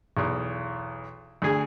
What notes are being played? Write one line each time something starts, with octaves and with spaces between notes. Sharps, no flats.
B1 E2
D2 G#4